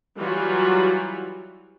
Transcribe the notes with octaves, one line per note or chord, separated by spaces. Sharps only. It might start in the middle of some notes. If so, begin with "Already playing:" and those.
E3 F#3 G3 F4 F#4